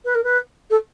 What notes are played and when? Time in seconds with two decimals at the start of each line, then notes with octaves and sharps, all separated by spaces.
0.04 B4
0.14 A#4
0.23 B4
0.70 A4